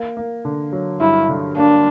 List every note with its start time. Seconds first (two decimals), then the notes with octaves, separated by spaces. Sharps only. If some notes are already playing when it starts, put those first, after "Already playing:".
Already playing: A#3
0.17 A#3
0.45 D3
0.72 F#3
1.00 G2 E4
1.29 D3
1.56 A#3 D4